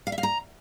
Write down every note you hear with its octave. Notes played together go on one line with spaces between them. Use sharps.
F5
E5
F5
A#5